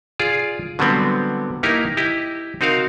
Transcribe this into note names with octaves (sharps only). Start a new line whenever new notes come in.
F4 G#4 D5
D3 F#3 G3 B3 C4
A#3 D#4 E4 G4 A#4
E4 G4 D#5
C4 D#4 F#4 A#4 F5